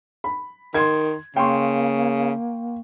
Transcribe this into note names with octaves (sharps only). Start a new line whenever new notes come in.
B5
D#3 C6 G#6
C#3 A#3 G5 C6 C#6